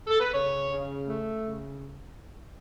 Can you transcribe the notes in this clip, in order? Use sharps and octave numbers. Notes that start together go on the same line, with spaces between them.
A4
B4
C#3 C#5
C#3
A3
C#3